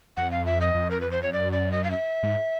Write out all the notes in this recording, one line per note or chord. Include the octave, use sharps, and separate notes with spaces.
F2 F#5
F5
E5
D#5
F2
A#4
B4
C5
C#5
F#2 D5
D5
D#5
F5
E5
G#2